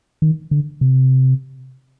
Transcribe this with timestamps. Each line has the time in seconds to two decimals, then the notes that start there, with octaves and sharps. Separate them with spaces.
0.22 D#3
0.51 D3
0.81 C3